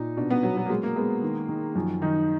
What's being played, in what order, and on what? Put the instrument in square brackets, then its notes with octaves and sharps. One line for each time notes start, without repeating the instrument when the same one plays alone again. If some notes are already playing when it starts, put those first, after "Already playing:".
Already playing: [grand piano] A#2 [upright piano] D#4
[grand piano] B2 [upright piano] D4
[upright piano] B3
[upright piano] F#3 [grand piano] B3
[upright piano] F#3
A#3
[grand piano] F#3 [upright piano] G#3
[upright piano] A#3
[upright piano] G#3 [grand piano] B3
[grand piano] D#3
D#3
[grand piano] F#2 [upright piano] F3
[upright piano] D#3 [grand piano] D#4